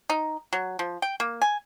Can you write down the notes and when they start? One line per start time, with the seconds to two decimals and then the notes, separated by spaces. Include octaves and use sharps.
0.10 D#4
0.53 F#3
0.79 F3
1.02 G5
1.20 A#3
1.42 G#5